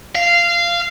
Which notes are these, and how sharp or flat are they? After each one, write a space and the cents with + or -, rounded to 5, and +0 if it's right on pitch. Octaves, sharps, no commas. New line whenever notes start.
F5 -15